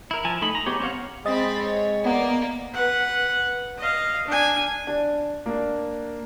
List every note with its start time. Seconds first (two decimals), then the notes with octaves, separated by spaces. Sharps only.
0.11 E4 A#4
0.25 F3 G#5 A5
0.42 A3 D#4 D#5 B5
0.55 A#5
0.66 G#3 B3 G4 C#5
0.80 C4 C#4 C#5 F5 F#5
1.26 G#3 C4 D#5 B5 A6
1.63 C#5
2.05 A#3 B3 D5
2.73 B4 F#5
3.78 D#5 F5
4.27 D4 G#5
4.87 D4
5.46 A#3 D4